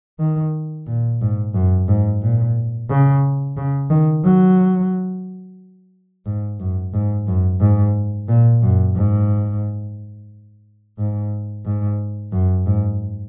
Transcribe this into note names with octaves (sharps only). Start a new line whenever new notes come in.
D#3
A#2
G#2
F#2
G#2
A#2
C#3
C#3
D#3
F#3
G#2
F#2
G#2
F#2
G#2
A#2
F#2
G#2
G#2
G#2
F#2
G#2